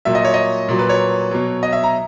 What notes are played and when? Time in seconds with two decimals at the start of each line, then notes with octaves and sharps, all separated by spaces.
0.05 A#2 F#3 E5
0.15 D#5
0.25 C#5
0.34 D#5
0.69 A#2 F#3
0.79 B4
0.89 C#5
1.31 B2 F#3
1.63 D#5
1.73 E5
1.84 A#5